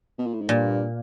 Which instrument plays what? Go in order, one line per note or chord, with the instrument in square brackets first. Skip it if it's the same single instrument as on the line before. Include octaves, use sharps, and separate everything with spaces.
[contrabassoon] B2
A#2
A2
G#2
[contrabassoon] G2 [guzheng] A#2